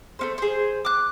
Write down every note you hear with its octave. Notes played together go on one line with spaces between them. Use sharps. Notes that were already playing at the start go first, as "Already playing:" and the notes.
A3 C#4 C5
G#4 C5
D6 F#6